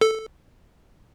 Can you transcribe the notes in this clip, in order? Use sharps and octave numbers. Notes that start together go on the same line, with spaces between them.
A4